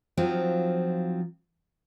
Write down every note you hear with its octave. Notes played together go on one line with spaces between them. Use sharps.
F3 F#3 C4 D#4 F4